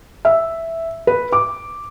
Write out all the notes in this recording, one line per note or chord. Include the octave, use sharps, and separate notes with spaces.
E5
B4
D6